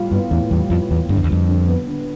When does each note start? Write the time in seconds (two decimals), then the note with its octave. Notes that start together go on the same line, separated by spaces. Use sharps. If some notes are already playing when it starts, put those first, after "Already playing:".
Already playing: A2 G3 F4
0.11 G2 B3
0.31 E2 A2
0.51 E2 G3
0.70 F2 F4
0.90 E2 B3
1.09 G2 D3
1.17 F2
1.24 E2
1.30 F2 G3
1.49 D4
1.68 B3
1.87 D3